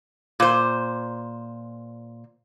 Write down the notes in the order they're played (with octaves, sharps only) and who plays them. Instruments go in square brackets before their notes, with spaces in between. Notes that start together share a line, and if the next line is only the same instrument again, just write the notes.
[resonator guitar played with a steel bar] A#2 C5